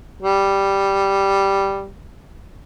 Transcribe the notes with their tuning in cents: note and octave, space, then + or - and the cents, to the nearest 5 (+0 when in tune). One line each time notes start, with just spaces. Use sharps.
G3 +0